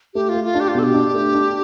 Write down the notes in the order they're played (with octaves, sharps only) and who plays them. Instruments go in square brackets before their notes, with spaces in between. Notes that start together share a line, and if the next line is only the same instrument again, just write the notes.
[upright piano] A3 [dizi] G4
[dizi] F4
[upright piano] A3
[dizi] F4
[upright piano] D4
[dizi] G4
F4
[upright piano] B2 [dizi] A4
[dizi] G4
[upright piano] D4
A3
D4